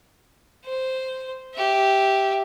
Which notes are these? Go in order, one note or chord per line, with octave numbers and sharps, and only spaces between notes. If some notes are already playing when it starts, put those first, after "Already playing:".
C5
G4 E5